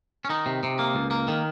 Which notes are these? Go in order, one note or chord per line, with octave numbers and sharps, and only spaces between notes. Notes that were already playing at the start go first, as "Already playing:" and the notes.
C#4
D#3 D#4
C3
C3
A#3
C#2
A#3
D#3